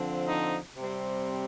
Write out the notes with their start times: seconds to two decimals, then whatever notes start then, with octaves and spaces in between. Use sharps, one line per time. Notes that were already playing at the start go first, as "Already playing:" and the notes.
Already playing: D3 F3 C4
0.27 D#4
0.77 C3 G3 C4